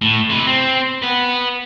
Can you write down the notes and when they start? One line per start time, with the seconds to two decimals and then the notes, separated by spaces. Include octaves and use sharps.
0.02 A2
0.30 C3 B4
0.47 C4
1.02 B4 F#5